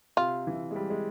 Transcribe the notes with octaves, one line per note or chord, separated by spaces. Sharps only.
C3 F4
E3
G#3
G3
G#3